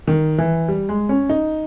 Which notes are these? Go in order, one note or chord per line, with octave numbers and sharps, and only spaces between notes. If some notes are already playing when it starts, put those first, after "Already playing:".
D#3
E3
G3
G#3
C#4
D#4